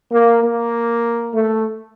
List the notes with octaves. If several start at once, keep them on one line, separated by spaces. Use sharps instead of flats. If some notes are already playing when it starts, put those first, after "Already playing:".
A#3
A#3
A3